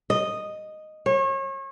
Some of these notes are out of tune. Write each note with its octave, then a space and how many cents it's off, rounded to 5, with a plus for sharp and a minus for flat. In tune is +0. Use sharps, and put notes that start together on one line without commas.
D#5 -5
C#5 -35